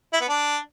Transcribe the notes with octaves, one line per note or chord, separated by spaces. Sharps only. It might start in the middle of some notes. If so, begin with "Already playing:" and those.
E4
B3
D4